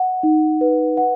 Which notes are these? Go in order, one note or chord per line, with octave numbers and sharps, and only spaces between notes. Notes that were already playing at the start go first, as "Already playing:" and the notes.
Already playing: D#5 F#5
D#4
B4
F#5